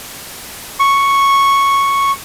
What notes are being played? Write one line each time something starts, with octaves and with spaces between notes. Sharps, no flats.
C#6